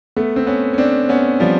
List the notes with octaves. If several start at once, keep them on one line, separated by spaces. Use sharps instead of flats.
A3 B3
C4
B3 C#4
C#4
C4 D4
B3 C#4
F3 G3